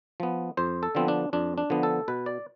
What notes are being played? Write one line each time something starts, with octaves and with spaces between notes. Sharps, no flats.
F3 B3
F2 C5
A4
D3 F3 B3 C4
D4
F2 D4
D4
D3 F3 B3
A4
B2 B4
D5